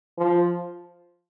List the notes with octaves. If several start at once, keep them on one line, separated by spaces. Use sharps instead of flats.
F3